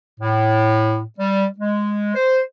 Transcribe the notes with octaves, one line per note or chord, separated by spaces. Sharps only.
A2
G3
G#3
C5